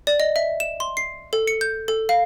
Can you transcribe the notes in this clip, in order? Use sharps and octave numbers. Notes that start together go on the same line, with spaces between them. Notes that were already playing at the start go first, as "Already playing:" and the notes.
D5
D#5
E5
E7
C6
C7
A4
C#7
G6
A4
F5